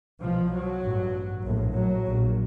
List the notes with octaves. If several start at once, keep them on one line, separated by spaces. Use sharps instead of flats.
C2 B2 F3
F#3
A1 G2
A#1 A2
F#3
A#1 A#2